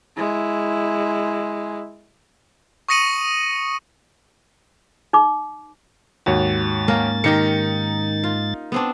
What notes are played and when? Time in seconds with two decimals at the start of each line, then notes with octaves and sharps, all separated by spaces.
0.17 G#3 E4
2.89 C#6 D#6 A#6 C#7 D#7 F#7
5.13 D#4 D6
6.26 D#2 G#2 F#4 C#5 A6
6.88 A#3 C#4 A#4
7.24 D#3 D#4 G4 A#4 C#7
8.23 F4
8.72 B3 C4 D4